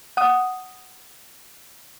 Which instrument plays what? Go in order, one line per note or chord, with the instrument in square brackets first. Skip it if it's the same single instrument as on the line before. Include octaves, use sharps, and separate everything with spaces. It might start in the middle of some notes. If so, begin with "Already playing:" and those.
[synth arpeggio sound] F#5 D#6